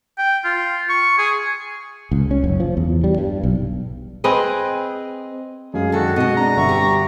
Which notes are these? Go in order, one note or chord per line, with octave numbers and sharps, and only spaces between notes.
G5
F4
C#6
G#4
C#2
C#4
F#1
F3
E2
G3
G2
B1
C4 G#4 B4 D#5
F#2 G#3 G#4 F5
D3 D#3 F#4 A4
B2 G#3 C4 D#5
D4 A#5
G1 E5 F#5 C#6
G4